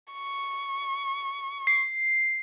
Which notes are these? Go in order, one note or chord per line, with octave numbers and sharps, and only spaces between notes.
C#6
C7